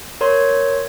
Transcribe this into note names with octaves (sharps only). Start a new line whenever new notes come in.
A#4 C#5 C6 G#6